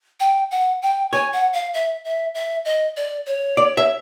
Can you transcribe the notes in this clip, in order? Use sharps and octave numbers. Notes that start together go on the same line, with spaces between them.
G5
F#5
G5
C#5 G#5
F#5
F5
E5
E5
E5
D#5
D5
C#5
D5
E5